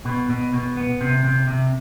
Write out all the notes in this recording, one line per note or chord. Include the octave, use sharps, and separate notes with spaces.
B2
B2
B2
B3
C3
C3
C3